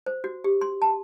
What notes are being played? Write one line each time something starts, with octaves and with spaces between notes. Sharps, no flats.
C5
F#4
G4
C6
A5